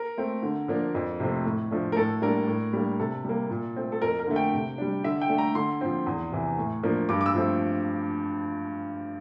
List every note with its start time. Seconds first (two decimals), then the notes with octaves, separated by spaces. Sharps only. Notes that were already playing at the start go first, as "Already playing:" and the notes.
Already playing: A#4
0.18 A3 C4
0.43 D3
0.68 F3 A#3 D4
0.95 F2
1.20 C3 F3 A3 C4
1.45 A2
1.71 F3 A3 D4
1.92 A#4
1.96 A2 A4
2.22 G3 A#3 D4 A#4
2.47 A2
2.73 G3 A#3 D4
2.99 C3 A4
3.24 G3 A#3
3.50 A#2
3.76 A3 C4
3.92 A4
4.02 F2 A#4
4.19 A#4
4.27 D3 A3
4.36 G5
4.53 C3
4.78 G3 D4
5.04 D3 E5
5.22 G5
5.29 A3 D4
5.38 A#5
5.55 D3 C6
5.81 F3 C4
6.07 E2
6.32 C3 E3
6.58 A2
6.83 F3 A#3 D4
7.09 G2 D6
7.21 D6
7.26 E6
7.35 F3 A3 C4